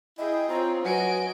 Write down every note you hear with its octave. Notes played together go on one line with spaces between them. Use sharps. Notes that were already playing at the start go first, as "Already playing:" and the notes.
E4 G#4 D#5 G5
C4 F4 C#5 A#5
F#3 F#4 B4 D#5 G#5 D7